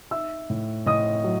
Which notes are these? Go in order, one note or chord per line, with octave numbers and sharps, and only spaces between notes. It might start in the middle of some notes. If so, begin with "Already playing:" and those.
D#4 E5 E6
A2
A2 D#5 D#6
F#3